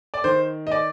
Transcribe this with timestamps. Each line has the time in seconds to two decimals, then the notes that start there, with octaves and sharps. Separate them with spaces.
0.14 D5
0.24 D#3 C5
0.67 D#5
0.72 D5